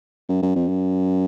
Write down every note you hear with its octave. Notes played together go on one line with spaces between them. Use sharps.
F#2
F#2
F2
F#2